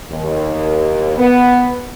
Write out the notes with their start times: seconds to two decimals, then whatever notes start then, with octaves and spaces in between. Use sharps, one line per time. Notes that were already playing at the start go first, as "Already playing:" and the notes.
0.11 D#2
1.18 B3